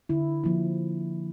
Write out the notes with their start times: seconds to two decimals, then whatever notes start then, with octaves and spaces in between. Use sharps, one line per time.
0.09 D3 E4
0.44 F3 A#3 E4